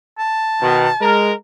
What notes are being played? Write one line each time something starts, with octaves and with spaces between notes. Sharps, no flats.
A5
B2 D#3
G#3 A#4